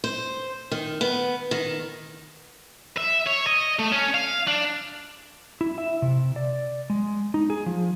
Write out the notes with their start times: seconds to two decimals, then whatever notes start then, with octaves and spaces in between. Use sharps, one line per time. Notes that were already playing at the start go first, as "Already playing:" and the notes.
0.04 C5
0.72 D#3
1.01 B3
1.51 D#3
2.97 E5
3.27 C#5
3.47 D#5
3.79 A3
3.92 C#4
4.14 F5
4.48 D4
5.61 E4
5.78 E5
6.02 C3
6.36 D5
6.90 G#3
7.34 D#4
7.50 G#4
7.66 F3